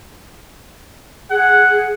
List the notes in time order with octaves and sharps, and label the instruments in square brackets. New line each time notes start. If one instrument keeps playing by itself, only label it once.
[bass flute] G#4 [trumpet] F#5